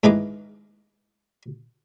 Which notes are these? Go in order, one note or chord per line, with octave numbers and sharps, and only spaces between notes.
G#2 D#3 E3 G#3 B4 D6